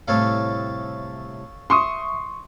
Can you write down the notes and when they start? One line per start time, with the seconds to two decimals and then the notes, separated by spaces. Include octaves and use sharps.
0.08 A2 C3 G3 A4 C#5 F5
1.70 E5 C6 C#6 D#6